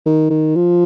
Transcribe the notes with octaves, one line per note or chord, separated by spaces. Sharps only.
D#3
D#3
F3